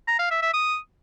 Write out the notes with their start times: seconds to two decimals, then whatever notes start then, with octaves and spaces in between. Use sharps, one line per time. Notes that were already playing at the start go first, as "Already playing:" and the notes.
0.08 A#5
0.19 F5
0.31 E5
0.42 E5
0.54 D#6